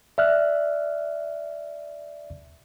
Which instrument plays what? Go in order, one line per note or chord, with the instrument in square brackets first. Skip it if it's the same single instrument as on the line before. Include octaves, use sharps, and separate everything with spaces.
[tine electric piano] D5 E5 F6 F#6